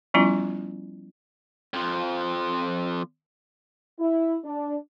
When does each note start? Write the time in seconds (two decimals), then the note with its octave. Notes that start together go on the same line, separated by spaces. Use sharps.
0.14 F3 G3 B3 C#4 E4 F4
1.74 F2 F3
3.99 E4
4.44 D4